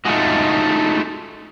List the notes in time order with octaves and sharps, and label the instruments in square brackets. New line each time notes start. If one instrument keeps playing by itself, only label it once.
[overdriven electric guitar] G#3 A3 [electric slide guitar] D#4 F4 F#4